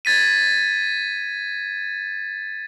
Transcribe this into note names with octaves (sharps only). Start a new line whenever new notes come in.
G#6 A6 B6 D#7